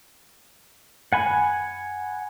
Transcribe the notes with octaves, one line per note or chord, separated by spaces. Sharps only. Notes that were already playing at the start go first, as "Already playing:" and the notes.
F#5 G#5 B5